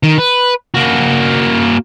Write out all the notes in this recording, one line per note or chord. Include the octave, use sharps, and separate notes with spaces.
D#3
B4
A#3 F#4